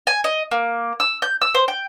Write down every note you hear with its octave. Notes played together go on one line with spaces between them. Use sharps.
G#5
D#5
A#3
E6
G6
E6
C5
G5